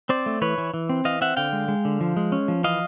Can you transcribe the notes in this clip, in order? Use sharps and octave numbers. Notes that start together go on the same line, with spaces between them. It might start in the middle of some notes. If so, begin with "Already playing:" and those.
C4 C5 D5
A3
E3 B4 C#5
E3
E3
C4
E3 D#5 F5
C4 E5 F#5
D3 F5 G5
G#3
G#3
D3
F3
G#3
C#4
F3
E3 D#5 F5